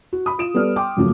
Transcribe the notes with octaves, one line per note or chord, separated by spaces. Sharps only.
F#4
B5 D#6
F4 D7 E7
G3 B3 A4 D5 F6
G5 C6 D6
F#2 C#3 F3 A3 A#3 F#4